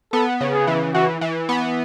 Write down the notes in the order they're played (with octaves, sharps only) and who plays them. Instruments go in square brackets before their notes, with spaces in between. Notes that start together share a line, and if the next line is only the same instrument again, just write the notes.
[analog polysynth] B3 [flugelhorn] A4
[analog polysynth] C#3
[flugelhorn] G#4
[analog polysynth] E3
[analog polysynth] E3 [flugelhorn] F#4
[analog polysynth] E3
B3